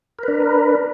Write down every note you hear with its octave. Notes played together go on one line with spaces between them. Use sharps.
D4 A#4 B4